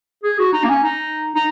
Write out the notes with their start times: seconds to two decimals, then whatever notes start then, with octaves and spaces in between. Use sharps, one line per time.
0.23 G#4
0.39 F#4
0.53 D#4
0.64 A#3
0.69 C#4
0.84 D#4
1.35 D#4